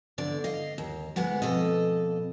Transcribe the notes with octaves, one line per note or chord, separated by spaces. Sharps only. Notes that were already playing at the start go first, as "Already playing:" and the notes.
E2 D3 D5
D#5 F5
D#2
D2 G#2 G#3 B3 F#5
F2 B2 A4 D#5